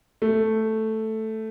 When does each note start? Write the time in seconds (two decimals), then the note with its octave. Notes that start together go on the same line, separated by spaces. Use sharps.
0.22 A3